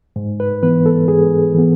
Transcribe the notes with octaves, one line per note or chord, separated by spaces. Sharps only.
G#2
B4
E3 B3 B4
A4
G#2 G#4
E3 B3